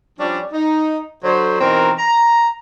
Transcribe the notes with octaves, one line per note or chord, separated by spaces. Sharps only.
F3 G3 C#4 D4
D#4
D3 F#3 C5
B2 D#3 E3 C4 A#4 A#5
A#5